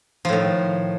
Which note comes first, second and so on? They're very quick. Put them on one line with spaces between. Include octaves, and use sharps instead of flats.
F3 A2 D#3